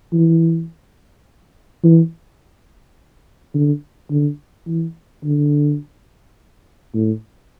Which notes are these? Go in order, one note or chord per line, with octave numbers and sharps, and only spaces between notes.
E3
E3
D3
D3
E3
D3
A2